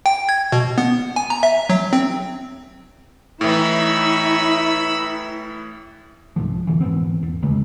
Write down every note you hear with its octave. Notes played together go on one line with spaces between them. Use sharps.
G5
G#6
B2
B3
G#5
A#5
E5
F#3
C4
A2 E3 D#4 E4 C#5 B5 E6
C2 G#2 C3 F3
B1 F2 D3 E3
G#2 E3 B3 C4
E2
D2 C#3 G#3